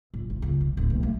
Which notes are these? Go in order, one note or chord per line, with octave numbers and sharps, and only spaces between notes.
A#1
A#1
C#2
C3
D1
B1
A3